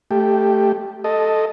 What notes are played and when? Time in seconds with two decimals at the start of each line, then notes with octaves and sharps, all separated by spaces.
0.11 A3 G4
1.04 A4 D#5